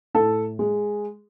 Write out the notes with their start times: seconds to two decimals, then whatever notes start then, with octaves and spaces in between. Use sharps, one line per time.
0.14 A2 A4
0.59 G#3